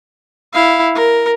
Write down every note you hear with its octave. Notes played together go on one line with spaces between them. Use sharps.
E4 F5
A#4